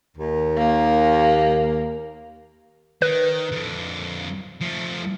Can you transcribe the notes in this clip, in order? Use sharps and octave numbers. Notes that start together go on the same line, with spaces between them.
D#2
A#3
D#3 B4
F2 D3
F3 A3